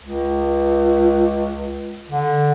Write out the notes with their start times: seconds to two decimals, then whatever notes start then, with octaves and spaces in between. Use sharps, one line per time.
0.03 C#2
2.10 D3